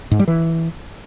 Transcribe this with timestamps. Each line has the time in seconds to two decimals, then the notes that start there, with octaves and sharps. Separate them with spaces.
0.11 G#2
0.19 G3
0.28 E3